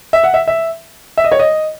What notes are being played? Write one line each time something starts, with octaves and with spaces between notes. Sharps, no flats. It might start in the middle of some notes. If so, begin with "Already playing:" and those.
E5
F#5
E5
E5
E5
D#5
C#5
D#5